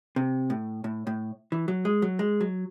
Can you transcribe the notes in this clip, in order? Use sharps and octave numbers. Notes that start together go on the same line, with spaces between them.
C3
A2
A2
A2
E3
F#3
G#3
F#3
G#3
F#3